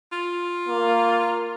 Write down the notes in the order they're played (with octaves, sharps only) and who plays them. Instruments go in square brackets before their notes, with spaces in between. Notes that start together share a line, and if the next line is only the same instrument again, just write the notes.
[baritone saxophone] F4
[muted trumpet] A#3